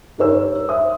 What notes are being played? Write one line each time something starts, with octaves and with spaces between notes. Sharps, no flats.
G2 D#4 A#4 C#5 E6
C5 E5 D#6